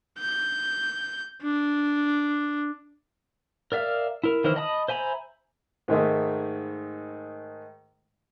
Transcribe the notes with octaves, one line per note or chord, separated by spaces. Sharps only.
G6
D4
A#4 D5 E5 F5 F6
E4 A#4
D#3 E3 E4 C5 F6
D#5 A5 B5 D#6
C5 E5 G#5 A#5 B5
G#2 D#3 G#3 A3